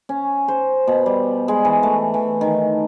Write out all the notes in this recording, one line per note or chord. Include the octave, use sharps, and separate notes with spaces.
C#4
C5
B2
G3
G#3
E3
A3
E3
D#3